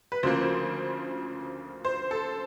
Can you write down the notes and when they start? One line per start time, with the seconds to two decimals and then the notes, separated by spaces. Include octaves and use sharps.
0.12 B4
0.23 D2 C#3 F3 A#3 C5
1.85 C5
2.11 A4